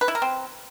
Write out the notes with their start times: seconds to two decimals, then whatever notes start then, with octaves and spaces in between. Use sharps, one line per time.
0.01 B4
0.08 E4
0.15 A#4
0.22 C4